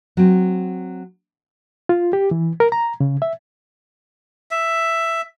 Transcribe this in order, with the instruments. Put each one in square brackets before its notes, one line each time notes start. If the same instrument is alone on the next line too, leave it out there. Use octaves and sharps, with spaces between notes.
[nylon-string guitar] F#3 C4
[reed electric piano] F4
G4
E3
A#4
A#5
C#3
E5
[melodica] E5